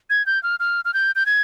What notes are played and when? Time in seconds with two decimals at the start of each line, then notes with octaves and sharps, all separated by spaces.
0.10 G#6
0.26 G6
0.43 F6
0.60 F6
0.85 F6
0.94 G6
1.16 G6
1.26 G#6